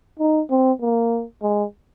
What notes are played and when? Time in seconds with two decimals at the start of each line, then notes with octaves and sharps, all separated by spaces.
0.19 D#4
0.51 C4
0.81 A#3
1.42 G#3